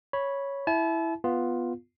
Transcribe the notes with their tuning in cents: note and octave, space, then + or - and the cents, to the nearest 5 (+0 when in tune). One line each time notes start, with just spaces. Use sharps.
C#5 +0 B5 -10
E4 +0 A5 -40
B3 +0 F4 +0